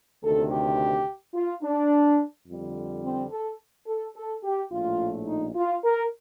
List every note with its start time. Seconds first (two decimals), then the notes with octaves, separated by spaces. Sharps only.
0.22 D2 C3 D#3 A4
0.51 G4
1.34 F4
1.63 D4
2.47 F2 D3 G3
3.04 C4
3.31 A4
3.87 A4
4.15 A4
4.44 G4
4.71 A#1 A2 A3 F4
5.27 D#4
5.55 F4
5.84 A#4